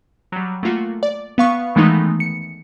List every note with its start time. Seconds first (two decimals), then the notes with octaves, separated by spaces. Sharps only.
0.32 F#3 G3
0.63 A3 A#3 F4 F#4
1.03 D5
1.38 B3 F5 C#6
1.75 D#3 E3 G#3 A3 B3 D#4
2.20 C#7